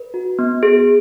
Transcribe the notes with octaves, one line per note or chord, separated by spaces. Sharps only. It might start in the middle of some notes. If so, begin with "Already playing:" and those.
Already playing: B4
F#4
B3
G#4